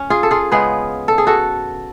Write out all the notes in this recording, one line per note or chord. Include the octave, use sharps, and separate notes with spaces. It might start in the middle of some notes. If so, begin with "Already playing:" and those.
Already playing: C#4
F4 G#4
A4
F4 G#4
C#3 G#3 B3 G#4 B4
A4
G#4
F#4 A4